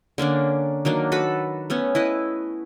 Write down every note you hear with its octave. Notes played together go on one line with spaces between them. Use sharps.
D3 A#3 C#4 D4
D#3 F#3 A#3 D4
F#4 A4 B4 B5
A3 B3 C#4
E4 B4 D#5